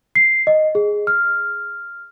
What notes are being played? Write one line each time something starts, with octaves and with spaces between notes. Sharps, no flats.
C7
D#5
G#4
F6